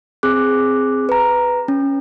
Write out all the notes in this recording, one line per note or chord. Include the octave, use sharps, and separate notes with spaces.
C4 G#4 D6 F#6
B4 A#5
C#4